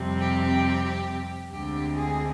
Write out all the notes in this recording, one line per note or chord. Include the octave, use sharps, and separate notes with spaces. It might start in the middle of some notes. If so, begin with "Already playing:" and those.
Already playing: F2 C3 G3 C4
G4
D2 D3 G#3 C4 G4
G#4